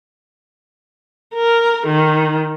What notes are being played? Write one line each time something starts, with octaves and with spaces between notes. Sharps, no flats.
A#4
D#3